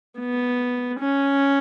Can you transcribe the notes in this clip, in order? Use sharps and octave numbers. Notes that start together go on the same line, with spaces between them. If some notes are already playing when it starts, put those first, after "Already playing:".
B3
C#4